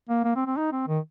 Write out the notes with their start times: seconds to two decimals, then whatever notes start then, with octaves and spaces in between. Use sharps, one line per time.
0.09 A#3
0.25 A#3
0.36 C4
0.46 C4
0.57 D#4
0.72 C4
0.88 D#3